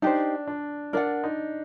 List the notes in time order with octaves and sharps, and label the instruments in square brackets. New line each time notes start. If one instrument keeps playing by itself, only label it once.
[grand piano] D4 [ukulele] D#4 G4 C5
[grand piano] D4
[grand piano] D4 [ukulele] A#4 D5 F#5
[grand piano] D#4